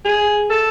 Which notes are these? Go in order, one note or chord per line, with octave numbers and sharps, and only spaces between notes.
G#4
A4